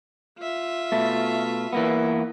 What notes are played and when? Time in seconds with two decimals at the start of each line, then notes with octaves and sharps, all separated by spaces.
0.39 F4 E5
0.92 B2 A3
1.73 E3 A#3 B3